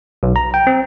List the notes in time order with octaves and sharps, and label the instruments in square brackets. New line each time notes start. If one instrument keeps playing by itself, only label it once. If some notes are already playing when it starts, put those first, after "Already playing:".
[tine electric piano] B1
A#5
G5
C4